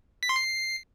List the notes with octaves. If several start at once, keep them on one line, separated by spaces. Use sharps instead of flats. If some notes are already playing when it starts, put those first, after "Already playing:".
B6
C6
C7